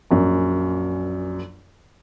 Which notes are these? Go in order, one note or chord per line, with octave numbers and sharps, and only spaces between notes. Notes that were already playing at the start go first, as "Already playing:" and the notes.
A#1 F#2